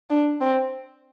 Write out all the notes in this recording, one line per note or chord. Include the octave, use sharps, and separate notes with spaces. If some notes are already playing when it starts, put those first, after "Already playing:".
D4
C4